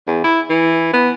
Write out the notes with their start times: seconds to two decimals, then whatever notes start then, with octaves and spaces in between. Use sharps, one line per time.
0.07 E2
0.24 E4
0.50 E3
0.93 B3